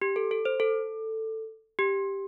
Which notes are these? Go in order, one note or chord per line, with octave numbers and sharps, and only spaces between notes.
G4
A4
A4
C5
A4
G4